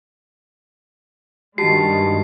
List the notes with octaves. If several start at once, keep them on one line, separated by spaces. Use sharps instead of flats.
G2 D#3 G#3 F#4 G4 A5 C7